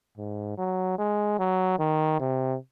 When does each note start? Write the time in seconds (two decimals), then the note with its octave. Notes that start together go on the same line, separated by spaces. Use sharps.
0.18 G#2
0.58 F#3
0.98 G#3
1.39 F#3
1.79 D#3
2.20 C3